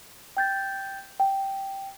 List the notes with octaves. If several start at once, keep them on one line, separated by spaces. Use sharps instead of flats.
G5 G6 A6
G5